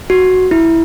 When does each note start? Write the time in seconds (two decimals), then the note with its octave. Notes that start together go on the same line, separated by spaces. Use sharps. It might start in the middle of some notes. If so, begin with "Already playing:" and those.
0.10 F#4
0.51 E4